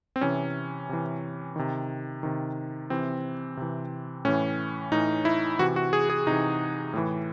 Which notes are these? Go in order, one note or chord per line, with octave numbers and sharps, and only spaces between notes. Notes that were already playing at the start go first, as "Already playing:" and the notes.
C4
C3 E3 C#4
C3 E3
C3 D#3
C3 D#3
C3 E3 C4
C3 E3
A2 E3 C#4
A2 E3 D#4
E4
C3 E3 F#4
F#4
G#4
G#4
C3 E3 D#4
A2 E3